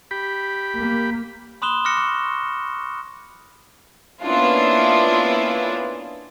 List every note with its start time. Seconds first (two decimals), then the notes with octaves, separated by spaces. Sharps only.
0.11 G4 B5
0.78 A#3
1.62 B5 C6 D#6 F#6 E7 G7
1.84 C6 D6 F6 F#6 A#6 C#7
1.97 C#6
4.24 A#3 B3 C#4 D4 E4 F4